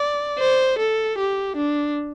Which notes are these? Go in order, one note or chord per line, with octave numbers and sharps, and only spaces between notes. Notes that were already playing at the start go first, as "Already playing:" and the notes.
Already playing: D5
C5
A4
G4
D4